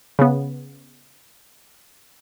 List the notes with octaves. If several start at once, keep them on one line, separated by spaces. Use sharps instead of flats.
C#3 B3